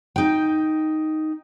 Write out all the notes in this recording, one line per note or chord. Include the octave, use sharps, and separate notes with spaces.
D#4 G5